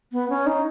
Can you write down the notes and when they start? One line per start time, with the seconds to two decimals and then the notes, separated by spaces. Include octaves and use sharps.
0.12 B3
0.30 C#4
0.46 D#4